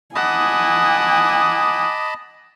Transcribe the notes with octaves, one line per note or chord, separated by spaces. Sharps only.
D#5 F#5 G#5 A5 B5 D6 D#6